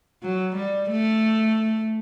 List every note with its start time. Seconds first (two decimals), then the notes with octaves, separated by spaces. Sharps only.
0.23 F#3
0.56 G3
0.90 A3